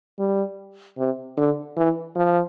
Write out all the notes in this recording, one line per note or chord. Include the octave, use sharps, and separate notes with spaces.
G3
C3
D3
E3
F3